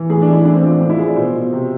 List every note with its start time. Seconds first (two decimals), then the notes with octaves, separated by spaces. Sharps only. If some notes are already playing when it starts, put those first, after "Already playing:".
Already playing: E3
0.10 A2 G#4
0.22 D4
0.27 E3
0.33 E4
0.45 A2 D4
0.54 C4
0.63 F3 D4
0.72 C4
0.80 A2 D4
0.90 E4
0.98 F3 G#4
1.08 D5
1.16 B2 C5
1.34 B2
1.52 C3